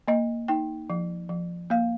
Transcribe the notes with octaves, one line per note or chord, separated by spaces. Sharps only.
A#3 D#5
D#4 G5
F3
F3
A#3 F5